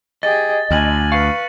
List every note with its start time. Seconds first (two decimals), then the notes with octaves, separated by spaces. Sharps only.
0.23 G4 G#4 D#5 A6
0.71 D2 G#5 A6 A#6 F#7
1.12 B4 F5 C#6 A6 C#7